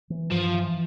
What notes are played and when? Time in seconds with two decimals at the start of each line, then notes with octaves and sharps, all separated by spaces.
0.10 E3
0.31 G2 F3
0.54 E3